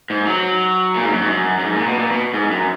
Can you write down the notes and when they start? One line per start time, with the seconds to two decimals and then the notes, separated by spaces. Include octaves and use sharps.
0.10 G#2
0.27 F#3
0.96 A#2
1.04 G#2
1.13 F#2
1.22 G#2
1.30 F#2
1.59 F#2
1.65 G#2
1.76 A#2
1.87 B2
1.99 A#2
2.11 B2
2.34 G#2
2.51 F#2